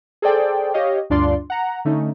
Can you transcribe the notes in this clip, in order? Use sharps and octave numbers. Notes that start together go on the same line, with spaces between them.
G#4 A4 C5 D5 G5
G4 C#5 D#5 F5
D2 G2 D4 F4 D5 C6
F#5 A#5
D3 A3 C#4 D#4